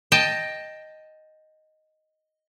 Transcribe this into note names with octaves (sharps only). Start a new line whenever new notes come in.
D#5 G5 A5